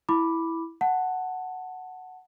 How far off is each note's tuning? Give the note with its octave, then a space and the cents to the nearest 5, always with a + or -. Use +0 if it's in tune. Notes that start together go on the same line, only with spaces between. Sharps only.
E4 +0 B5 +0 D6 +0
F#5 +0 A5 +10